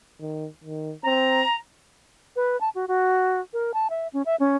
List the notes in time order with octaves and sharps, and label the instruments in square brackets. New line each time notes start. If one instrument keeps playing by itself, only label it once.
[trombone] D#3
D#3
[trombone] C4 [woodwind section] A#5
[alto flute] B4
A5
F#4
F#4
A#4
A5
E5
C#4
E5
C#4